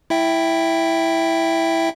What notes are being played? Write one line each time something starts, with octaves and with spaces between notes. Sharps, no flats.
E4 E5 G5